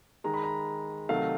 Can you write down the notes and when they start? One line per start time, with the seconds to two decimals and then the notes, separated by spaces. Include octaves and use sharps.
0.24 D#3 G#3 A#5
0.34 B5
0.44 A#5
1.09 C3 D#3 F#3 A3 F5